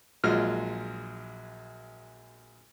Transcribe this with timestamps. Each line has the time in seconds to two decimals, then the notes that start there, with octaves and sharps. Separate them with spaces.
0.24 A#1 F#3 G#3 F4 F6